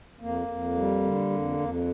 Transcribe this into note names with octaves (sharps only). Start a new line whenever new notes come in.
F2 A#3
F2
G3
D3
F2
F2